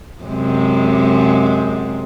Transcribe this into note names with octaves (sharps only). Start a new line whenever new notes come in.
F#2 C3 G#3